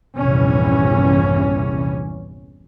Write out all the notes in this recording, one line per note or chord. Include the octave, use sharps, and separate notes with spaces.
A#1 E2 G2 C3 E3 C#4